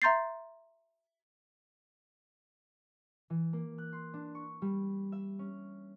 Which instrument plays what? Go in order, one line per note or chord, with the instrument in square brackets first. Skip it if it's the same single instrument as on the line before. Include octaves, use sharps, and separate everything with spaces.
[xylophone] E5 A#5 C6 G6 A6 C7
[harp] E3
A#3
F#6
C6
D4
C#6
G3
E5
C#4